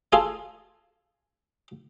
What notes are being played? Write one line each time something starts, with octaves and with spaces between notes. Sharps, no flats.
F4 G#4 A4 F5 G#5